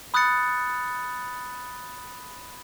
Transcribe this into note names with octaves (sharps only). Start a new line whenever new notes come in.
B5 D#6 F#6 G6 A6 C#7